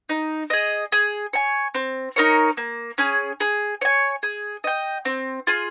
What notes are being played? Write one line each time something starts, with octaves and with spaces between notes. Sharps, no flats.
D#4
G#4 D#5
G#4
C#5 G#5
C4
D#4 A#4 C#5
A#3
C#4 G#4
G#4
C#5 G#5
G#4
D#5 G5
C4
F4 G#4